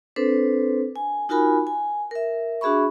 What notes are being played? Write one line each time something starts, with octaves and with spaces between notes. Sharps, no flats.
C4 D4 A4 B4 C5
G#5
D#4 F4 F#4 A#4 G#5 B5
G#5
A#4 E5
D4 F#4 G#4 E5 B5 C#6